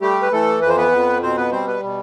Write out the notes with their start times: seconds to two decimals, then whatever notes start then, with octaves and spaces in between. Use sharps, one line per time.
0.01 G3 A3 G4
0.22 B4
0.32 E3 A3 A4
0.61 F2 B4
0.69 C5
0.77 B3 B4
0.92 F2
1.22 B2 C4 C5
1.37 B3 B4
1.52 G3 C4 C5
1.67 B3 B4
1.83 B2